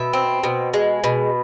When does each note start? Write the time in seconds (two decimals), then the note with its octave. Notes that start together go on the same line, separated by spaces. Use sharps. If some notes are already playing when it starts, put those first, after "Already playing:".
Already playing: B2 E5
0.13 C4
0.43 B2
0.74 G#3
1.04 B2